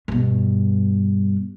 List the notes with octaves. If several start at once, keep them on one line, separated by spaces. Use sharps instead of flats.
G2 B2